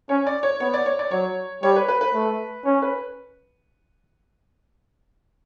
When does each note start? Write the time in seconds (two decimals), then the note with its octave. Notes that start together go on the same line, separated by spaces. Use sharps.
0.09 C#4 C#5
0.27 D5
0.43 C#5
0.60 B3 C#5
0.74 D5
0.86 C#5
0.99 D5
1.11 F#3 C#5
1.63 G3 C#5
1.76 B4
1.88 B4
2.01 B4
2.14 A3
2.65 C#4 C#5
2.82 B4